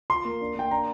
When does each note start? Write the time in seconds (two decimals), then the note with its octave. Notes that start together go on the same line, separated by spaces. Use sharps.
0.10 F4 C6
0.25 A#3
0.41 D4
0.55 A#3 G5
0.71 D4 A#5